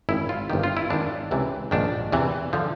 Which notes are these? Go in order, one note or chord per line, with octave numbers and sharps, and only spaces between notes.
G#1 F#2 D#3 E4
F4
G1 G2 D#3 G4
F4
E4
G#1 F#2 D#3 D4
C#2 C3 E3
A#1 G#2 D#3 D4
E2 C3 E3
D3 F3